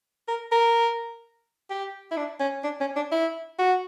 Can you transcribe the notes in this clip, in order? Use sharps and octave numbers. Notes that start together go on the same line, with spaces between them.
A#4
A#4
G4
E4
D4
C#4
D4
C#4
D4
E4
F#4